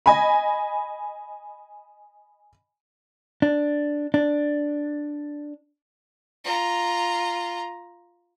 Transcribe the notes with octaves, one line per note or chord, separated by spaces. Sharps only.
D#5 G#5 B5
D4
D4
F4 A#5